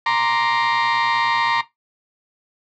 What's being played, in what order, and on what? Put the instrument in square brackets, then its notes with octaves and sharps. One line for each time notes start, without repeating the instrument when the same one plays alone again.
[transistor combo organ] A#5 C6 D6